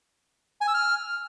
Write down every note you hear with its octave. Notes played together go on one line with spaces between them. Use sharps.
G#5
E6
F6